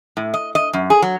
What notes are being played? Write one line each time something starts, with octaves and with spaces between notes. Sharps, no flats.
A2
D#5
D#5
F#2
G#4
F#3